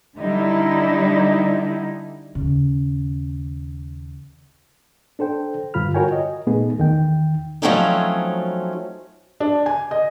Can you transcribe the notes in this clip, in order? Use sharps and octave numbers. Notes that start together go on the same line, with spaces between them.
D3 G3 D#4 E4
D#2 C#3
D4 A4 C5 G5
G2 D3 F4 B5 F6
F4 F#4 A#4 C#5 G5 G#5
D#5
A#2 A3 B3 D#4 G#4
E2 D#3 G5
F3 F#3 A3 C4 C#4 D#4
D4
G#5
D#5